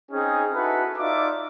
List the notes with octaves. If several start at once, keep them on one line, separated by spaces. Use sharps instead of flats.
C4 C#4 D#4 G#4
D#4 E4 F#4 A4 B4
D#4 F4 D5 E5 D6